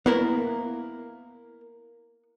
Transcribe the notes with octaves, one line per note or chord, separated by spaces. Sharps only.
A#3 B3 E4 A#4